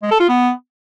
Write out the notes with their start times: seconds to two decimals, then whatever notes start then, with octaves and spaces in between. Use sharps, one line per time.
0.02 G#3
0.11 A4
0.20 F4
0.29 B3